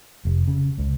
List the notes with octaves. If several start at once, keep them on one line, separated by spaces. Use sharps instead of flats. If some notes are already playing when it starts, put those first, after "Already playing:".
F1
C#3
C#2